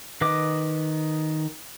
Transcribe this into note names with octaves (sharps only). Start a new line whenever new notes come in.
D#3 B4 D#5 D6